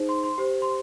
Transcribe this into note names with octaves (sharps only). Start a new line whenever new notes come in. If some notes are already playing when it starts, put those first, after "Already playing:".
Already playing: D#4 G#4 C5
C6
C6
G4 C5
C6